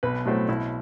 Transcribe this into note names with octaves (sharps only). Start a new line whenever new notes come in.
B1 B4
A2 F#3 A3 C4
B1 E4